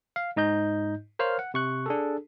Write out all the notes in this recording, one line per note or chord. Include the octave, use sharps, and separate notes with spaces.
F5
G#2 D#4 D#5 G6
A#4 C5 C#5 F5 F6
F#5
C3 C#6 F#6
D4 G#4 A4